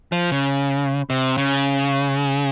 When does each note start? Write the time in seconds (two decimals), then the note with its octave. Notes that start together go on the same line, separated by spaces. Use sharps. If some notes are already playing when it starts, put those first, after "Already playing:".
0.12 F3
0.32 C#3
1.10 C3
1.38 C#3